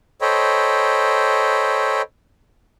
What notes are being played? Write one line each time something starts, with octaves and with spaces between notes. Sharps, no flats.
A4 C5 C#5 D#5 G5 B5